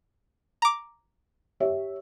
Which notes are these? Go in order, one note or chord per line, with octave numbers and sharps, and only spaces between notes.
A#5 D6
G4 C#5 E5